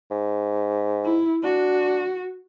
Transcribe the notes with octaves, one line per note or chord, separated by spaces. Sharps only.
G#2
E4
D4 F#4